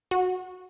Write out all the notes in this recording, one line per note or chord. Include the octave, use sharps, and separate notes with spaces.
F#4